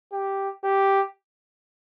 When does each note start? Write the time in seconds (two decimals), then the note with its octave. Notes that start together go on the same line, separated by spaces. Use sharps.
0.13 G4
0.64 G4